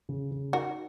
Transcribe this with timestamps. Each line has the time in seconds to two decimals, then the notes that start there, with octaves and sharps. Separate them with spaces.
0.09 C#3
0.31 C#3
0.53 D#4 F#4 A#4